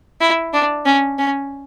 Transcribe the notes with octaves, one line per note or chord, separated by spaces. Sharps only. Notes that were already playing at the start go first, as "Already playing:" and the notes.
E4
D4
C#4
C#4